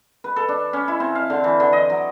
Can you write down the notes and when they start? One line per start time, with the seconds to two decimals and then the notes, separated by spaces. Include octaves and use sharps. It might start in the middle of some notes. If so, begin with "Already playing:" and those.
0.24 B4
0.36 A4
0.49 D4
0.73 C#4
0.88 E4
1.00 C4
1.15 F5
1.30 D3
1.44 E3
1.60 D3
1.73 D#5
1.90 F#3